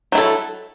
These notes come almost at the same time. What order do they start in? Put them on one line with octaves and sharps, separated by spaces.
F#3 E4 A4